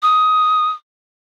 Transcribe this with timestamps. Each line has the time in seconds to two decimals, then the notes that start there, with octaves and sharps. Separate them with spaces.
0.02 D#6